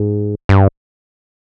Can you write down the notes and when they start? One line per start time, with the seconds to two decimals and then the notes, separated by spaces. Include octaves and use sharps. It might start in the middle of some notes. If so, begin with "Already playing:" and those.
Already playing: G#2
0.49 G2